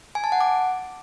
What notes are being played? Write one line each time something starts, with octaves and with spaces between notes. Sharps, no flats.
G#5
A5
F#5
D6